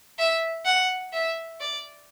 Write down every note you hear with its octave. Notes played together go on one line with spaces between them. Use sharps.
E5
F#5
E5
D5